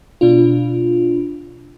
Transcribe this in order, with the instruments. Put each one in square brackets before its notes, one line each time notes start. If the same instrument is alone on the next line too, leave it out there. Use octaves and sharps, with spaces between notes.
[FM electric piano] B2 D4 F4